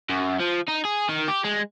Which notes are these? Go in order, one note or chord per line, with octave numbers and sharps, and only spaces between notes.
F#2
F3
D#4
G#4
D#3
G4
G#3